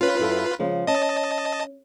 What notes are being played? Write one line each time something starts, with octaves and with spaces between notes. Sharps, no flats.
C#4 F4 B4
F#2 E4 A4
C#3 F3 G#3
C#4 D#5 A5